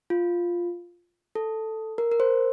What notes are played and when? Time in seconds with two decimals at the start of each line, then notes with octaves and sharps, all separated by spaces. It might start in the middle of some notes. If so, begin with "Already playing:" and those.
0.10 F4
1.35 A4
1.98 A#4
2.12 A#4
2.20 C5